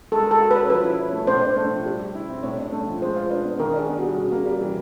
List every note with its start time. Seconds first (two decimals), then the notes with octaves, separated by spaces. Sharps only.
0.12 G#3 A4
0.26 A4 A#4
0.40 F#4
0.51 C#4 B4
0.70 F3 B4
0.84 E4
0.98 C#4
1.13 A3
1.27 A2 C5
1.42 D4
1.56 A3
1.71 F3
1.86 G3
1.99 G4
2.15 E4
2.30 C4
2.43 A2 C#5
2.58 D4
2.72 A3
2.87 F3
3.02 G#3 C5
3.16 F4
3.30 D4 B4
3.45 B3
3.60 D#3 A#4
3.74 D4
3.79 G#4
3.89 B3
3.99 G3 F#4
4.17 C#3
4.32 A#3
4.46 G3
4.60 E3